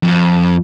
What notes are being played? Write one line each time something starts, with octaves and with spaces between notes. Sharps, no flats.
F2